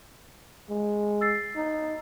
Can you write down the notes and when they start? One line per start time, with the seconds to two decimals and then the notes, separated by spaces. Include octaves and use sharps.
0.70 G#3
1.21 E6 A6 C7
1.55 D#4